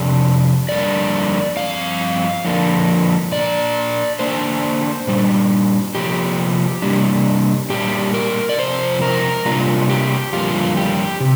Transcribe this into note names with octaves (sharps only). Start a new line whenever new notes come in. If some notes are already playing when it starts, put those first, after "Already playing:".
Already playing: F2 C3 D4
F2 D3 G3 A#3 D4 D5
G2 F3 C4 F5
F2 D3 F3 A#3 D4
A#2 A#3 D4 D5
D3 A#3 D4 C5
A#2 G3 D4
C3 F3 A#3 G4
C3 G3 A#3 D4
A#2 G3 A#3 D4 G4
A#4
D5
F2 C3 F3 C4 C5
A#4
C3 G3 A#3 D4 F4
G4
F2 D3 G3 A#3 F4
G4
C3